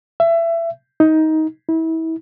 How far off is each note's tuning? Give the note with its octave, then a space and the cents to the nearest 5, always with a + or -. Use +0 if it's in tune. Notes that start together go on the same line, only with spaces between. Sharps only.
E5 +25
D#4 +15
E4 -30